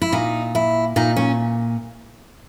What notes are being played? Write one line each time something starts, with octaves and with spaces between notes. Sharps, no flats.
E4
A#2 D#4
E4
A#2 D#4
C#4